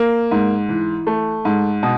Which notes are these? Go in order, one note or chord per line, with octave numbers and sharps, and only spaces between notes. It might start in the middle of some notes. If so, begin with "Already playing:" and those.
Already playing: A#3
G#2
E3
A3
G#2
B2